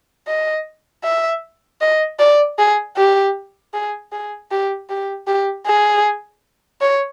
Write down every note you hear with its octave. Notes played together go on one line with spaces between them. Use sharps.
D#5
E5
D#5
D5
G#4
G4
G#4
G#4
G4
G4
G4
G#4
C#5